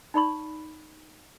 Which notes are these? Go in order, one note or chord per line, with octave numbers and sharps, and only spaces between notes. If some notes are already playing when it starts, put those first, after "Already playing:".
D#4 D5 B5 C#6